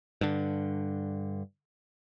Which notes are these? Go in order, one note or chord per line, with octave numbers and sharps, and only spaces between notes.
G2 D3